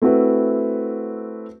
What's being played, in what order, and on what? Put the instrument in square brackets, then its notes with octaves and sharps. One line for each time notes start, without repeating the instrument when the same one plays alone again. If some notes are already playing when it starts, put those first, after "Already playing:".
[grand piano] A3 C4 E4 F#4 B4